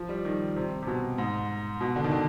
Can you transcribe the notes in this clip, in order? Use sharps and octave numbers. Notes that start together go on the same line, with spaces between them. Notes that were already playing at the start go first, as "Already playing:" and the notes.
Already playing: F3
G3
D#3
C3
C3
B2
G#2
B2
D3
D#3
D3